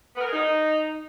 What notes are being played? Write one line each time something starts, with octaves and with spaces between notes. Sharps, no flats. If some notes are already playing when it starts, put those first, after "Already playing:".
B3
A#4
G#4
D#4